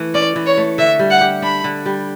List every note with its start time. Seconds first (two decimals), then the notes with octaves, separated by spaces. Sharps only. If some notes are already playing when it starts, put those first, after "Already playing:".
Already playing: E3 A3
0.14 C#4 D5
0.36 E3
0.46 C#5
0.57 A3
0.78 D3 E5
0.99 G3
1.11 F#5
1.21 G4
1.42 D4 B5
1.64 D3
1.86 G3